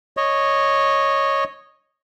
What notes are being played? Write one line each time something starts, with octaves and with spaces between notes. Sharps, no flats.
C#5 D#5